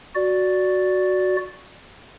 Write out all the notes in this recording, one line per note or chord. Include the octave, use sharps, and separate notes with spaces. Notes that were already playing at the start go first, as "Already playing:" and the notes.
F#4 D5